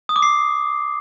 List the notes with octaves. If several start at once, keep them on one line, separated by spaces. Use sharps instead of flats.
D#6
D6
C7